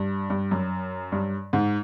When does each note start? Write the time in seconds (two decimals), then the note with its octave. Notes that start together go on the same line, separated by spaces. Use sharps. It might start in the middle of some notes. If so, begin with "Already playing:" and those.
Already playing: G2
0.30 G2
0.51 F#2
1.12 G2
1.53 G#2